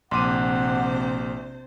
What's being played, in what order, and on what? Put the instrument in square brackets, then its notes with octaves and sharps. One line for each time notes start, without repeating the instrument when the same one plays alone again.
[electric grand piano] A#1 D6 D#7 [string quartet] C3 C5 [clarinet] F#5 [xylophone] C6